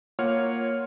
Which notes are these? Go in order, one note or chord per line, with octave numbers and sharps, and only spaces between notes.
A#3 F4 C#5 F#5 F6